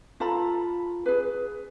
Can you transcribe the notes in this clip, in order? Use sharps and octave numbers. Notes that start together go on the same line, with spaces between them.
F4 A4 A#5 B5
G#4 B4